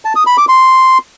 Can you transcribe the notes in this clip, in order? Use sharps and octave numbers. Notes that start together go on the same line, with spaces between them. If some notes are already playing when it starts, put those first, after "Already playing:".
A5
D#6
B5
D6
C6